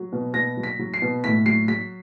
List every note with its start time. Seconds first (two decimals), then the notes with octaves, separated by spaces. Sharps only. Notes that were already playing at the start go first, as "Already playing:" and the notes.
Already playing: F#3
0.12 B2
0.34 B2 A#6
0.57 F#3
0.63 B6
0.79 F#3
0.94 C7
1.02 B2
1.24 A2 B6
1.46 F#3 C7
1.68 F#3 B6